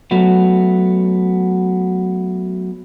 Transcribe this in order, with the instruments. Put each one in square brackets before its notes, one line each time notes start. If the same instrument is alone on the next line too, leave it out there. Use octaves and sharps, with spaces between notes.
[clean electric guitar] F#3 A3 B3